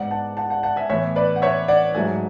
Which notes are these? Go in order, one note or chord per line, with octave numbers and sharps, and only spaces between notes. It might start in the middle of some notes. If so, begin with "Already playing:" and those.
Already playing: G#2 G#3 B3 D5 F#5
F#5 A5
F#5 A5
F#5 A5
F#5 A5
E5 G#5
A2 E3 B3 C#5 E5
B4 D5
F#5
C#5 E5
D5 F#5
G#2 F#3 A3 E5 G#5